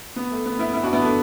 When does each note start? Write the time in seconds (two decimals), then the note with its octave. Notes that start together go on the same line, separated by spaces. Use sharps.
0.16 B3
0.31 A3
0.46 B3
0.59 B3 E4
0.73 B3 E4
0.83 D4 F#4
0.93 B3 E4
1.02 A3 D4